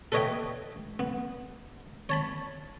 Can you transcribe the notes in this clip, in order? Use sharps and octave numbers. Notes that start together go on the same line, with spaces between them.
A4 B4 C#5 D#5 E5 G5
B3
C#5 A5 B5